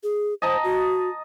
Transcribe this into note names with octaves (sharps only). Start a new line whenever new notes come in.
G#4
C5 D#5 A5 A#5
F#4